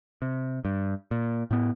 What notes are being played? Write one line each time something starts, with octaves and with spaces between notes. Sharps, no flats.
C3
G2
A#2
A2 B3